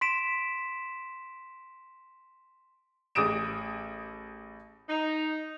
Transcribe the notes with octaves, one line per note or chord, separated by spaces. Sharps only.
C6 B6 D7 E7
A1 G#4 D6 D#6 D7 E7
D#4